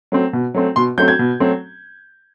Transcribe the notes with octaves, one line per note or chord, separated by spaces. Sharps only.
F#3 A3 C4
B2
F#3 A3 C4
B2 C6
F#3 A3 C4 G6
G#6
B2
F#3 A3 C4